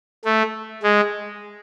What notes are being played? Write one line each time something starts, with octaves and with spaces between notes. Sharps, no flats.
A3
G#3